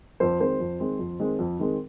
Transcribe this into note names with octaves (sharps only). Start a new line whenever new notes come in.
F2 C5
D#3 G#3 C4 C5
F2
D#3 G#3 C4
F2
D#3 G#3 C4
F2
D#3 G#3 C4